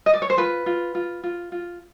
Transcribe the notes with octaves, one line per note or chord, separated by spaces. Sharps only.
D#5
D5
C#5
C5
F4 B4
F4
F4
F4
F4